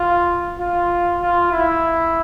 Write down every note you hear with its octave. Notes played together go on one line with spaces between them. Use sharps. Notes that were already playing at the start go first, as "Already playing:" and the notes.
Already playing: F4
F4
F4
E4